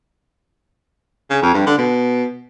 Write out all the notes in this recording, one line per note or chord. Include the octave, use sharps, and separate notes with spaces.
C#3
F2
G2
D3
B2